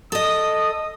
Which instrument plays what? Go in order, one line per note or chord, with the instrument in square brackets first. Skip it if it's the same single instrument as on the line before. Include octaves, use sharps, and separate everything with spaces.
[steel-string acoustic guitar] A4 D#5 [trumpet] D#6